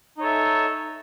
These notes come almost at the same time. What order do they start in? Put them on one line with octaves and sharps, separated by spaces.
D#4 C#5 A4 E5